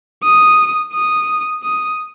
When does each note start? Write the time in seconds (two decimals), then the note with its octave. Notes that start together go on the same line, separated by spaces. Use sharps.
0.23 D#6
0.94 D#6
1.64 D#6